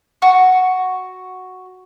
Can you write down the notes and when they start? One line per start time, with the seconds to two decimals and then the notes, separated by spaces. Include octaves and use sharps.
0.22 F#4 C#6